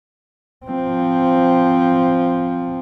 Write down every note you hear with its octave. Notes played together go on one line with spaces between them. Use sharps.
F3 C4